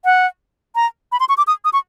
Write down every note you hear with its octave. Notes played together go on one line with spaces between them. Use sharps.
F#5
A#5
B5
C6
C#6
D6
D#6
D#6
C#6